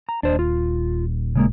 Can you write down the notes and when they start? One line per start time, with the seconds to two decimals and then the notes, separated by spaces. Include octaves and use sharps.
0.09 A#5
0.23 D#1 D4 C5 D#5
0.39 F4
1.35 C#3 G#3 A#3